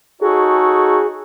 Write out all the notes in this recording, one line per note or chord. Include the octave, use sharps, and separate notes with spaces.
D#4 F#4 G#4 A4 C#5